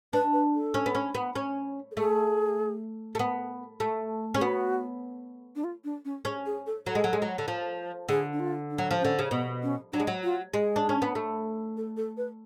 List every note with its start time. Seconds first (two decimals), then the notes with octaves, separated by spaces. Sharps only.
0.13 D4 B4
0.33 B4
0.54 A4
0.74 C#4
0.86 B3
0.95 C#4
1.15 B3
1.35 C#4
1.92 A4
1.96 A3 G#4
3.15 A3
3.19 B3
3.80 A3
4.34 C#4 G#4
4.41 B3 F#4
5.56 D4
5.64 F4
5.84 D4
6.05 C#4
6.25 C#4 G#4
6.46 G#4
6.66 A4
6.86 F#3 A4
6.95 G#3
7.04 F#3
7.13 G#3
7.22 F#3
7.38 D3
7.48 F3
8.09 D3 G#4
8.33 D4
8.40 F4
8.70 D4
8.78 F#3
8.91 F3
9.01 D3 C#4
9.19 C#3
9.31 B2 B3
9.63 C#4
9.93 F#3 D4
10.00 G#3
10.07 F#3
10.23 F4
10.54 G#3 G#4
10.76 D4
10.89 C#4
11.02 B3
11.15 A3
11.77 A4
11.97 A4
12.17 B4